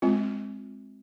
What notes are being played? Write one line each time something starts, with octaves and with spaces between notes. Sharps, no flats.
G#3 C4 F4